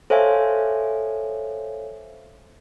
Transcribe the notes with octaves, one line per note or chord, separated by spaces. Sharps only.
A4 C5 C#5 E5 F5 G#5